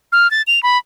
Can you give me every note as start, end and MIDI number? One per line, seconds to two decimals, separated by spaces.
0.12 0.30 89
0.31 0.42 93
0.47 0.62 101
0.63 0.78 83